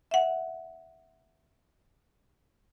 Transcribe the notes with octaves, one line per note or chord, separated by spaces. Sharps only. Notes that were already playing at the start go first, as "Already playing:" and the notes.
E5 F#5